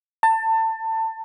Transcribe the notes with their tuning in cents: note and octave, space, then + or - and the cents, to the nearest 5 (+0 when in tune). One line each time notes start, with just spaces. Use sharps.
A5 +25